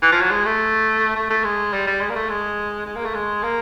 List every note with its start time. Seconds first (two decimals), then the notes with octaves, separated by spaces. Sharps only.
0.02 E3
0.12 F3
0.21 F#3
0.31 G#3
0.45 A3
1.16 A3
1.30 A3
1.44 G#3
1.73 G3
1.87 G3
2.01 G#3
2.10 A#3
2.15 A3
2.30 G#3
2.86 G#3
2.96 A#3
3.05 A3
3.15 G#3
3.43 A#3